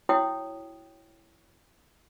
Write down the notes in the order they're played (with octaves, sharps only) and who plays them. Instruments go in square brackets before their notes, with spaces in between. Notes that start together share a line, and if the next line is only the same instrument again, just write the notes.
[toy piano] E4 F#4 C#5 G5 D#6